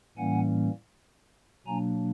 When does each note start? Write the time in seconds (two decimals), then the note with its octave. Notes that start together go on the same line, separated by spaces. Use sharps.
0.17 A2 E3 G3 A#3 C#4 F#5 G#5
1.66 B2 F#3 A#3 D4 G#5 A#5